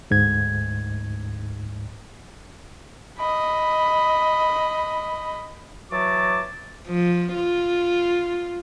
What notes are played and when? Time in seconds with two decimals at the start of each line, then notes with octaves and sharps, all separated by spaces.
0.11 D2 G#2 G#6
3.18 D#5 B5
5.92 E3 F#3 F#4 A5 D6
6.87 F3
7.34 F4